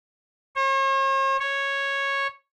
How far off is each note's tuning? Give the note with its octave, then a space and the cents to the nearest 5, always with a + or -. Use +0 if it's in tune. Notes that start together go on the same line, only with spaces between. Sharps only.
C#5 -45
C#5 -5